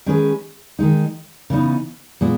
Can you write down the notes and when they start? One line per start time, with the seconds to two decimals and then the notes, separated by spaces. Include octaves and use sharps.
0.06 D#3 G#3 C#4 G#4 B4
0.79 D#3 G#3 D#4
1.50 C#3 E3 B3 D#4
2.21 A#2 G#3 B3